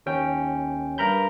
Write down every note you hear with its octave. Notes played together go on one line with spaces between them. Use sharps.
D#2 C#4 G5
G2 A#4 A#5 B5 G6